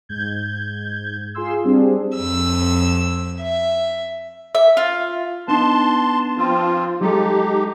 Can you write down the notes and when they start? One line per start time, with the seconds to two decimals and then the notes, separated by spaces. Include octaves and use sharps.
0.09 G#2 G6 G#6
1.35 F4 G#4 F5 C6 E6
1.64 G3 C4 D4 G#4
2.15 F2 E6
3.40 E5
4.55 E5
4.77 F4
5.48 B3 D4 D#4 A5 C6
6.37 F3 C4 F4
7.01 F#3 G#3 D#4 G4 A4